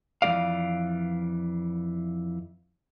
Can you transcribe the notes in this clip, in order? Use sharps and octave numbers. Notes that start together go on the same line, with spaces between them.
F2 E3 G3 F#4 D5 F5